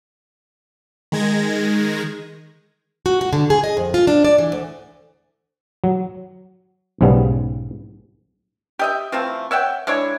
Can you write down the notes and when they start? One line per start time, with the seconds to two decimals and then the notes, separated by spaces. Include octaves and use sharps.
1.12 D#3 G#3 G#6 A#6
3.06 F#4
3.21 F#4
3.33 D3
3.50 G#4
3.64 D#5
3.77 F2
3.94 F4
4.07 D4
4.24 D5
4.38 E3
4.52 D2
5.84 F#3
7.01 B1 G#2 C#3 G3 B3
8.79 G4 D#5 E5
9.12 E3 A3 C4 F4
9.51 C#5 E5 F#5 G5
9.87 G#3 D4 E4 C#5